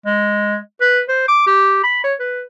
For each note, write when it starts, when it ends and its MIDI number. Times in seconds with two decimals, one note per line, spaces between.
0.06 0.57 56
0.81 1.01 71
1.09 1.25 72
1.28 1.46 86
1.47 1.79 67
1.84 2.02 83
2.04 2.14 73
2.20 2.42 71